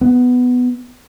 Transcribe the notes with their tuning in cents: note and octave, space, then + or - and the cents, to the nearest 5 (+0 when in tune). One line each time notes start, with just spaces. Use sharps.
B3 +10